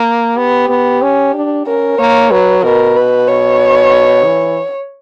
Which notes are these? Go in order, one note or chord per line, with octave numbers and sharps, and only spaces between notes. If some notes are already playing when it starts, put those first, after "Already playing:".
Already playing: A#3
B3 G4
B3
C#4
D4
C#4 A#4
A#3 C#5
F#3 B4
B2 A#4
B4
C#5
E3